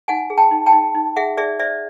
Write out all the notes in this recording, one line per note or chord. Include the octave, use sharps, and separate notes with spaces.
D#4 F#5 G#5
G#4
G5 A5
D#4
G5 A5
D#4
D#4
G#4 E5 F#5
G#4 D5 E5
C5 D5 E5